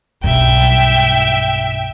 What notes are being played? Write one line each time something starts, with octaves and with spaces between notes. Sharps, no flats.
B1 G2 E5 G5